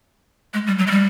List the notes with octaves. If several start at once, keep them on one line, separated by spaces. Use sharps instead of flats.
G#3
G3
F#3
G#3
G3